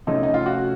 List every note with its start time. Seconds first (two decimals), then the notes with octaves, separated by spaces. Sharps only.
0.07 C3 F3 A3 C#4 D#4
0.23 D#4
0.34 F4
0.46 F#4